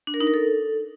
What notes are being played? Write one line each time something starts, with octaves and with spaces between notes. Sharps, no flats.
D4
A#4
D#4
A#4
A4